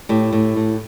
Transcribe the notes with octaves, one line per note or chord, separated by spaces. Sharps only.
A2 E4 G4
A2
A2